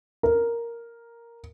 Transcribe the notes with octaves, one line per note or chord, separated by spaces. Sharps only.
A#4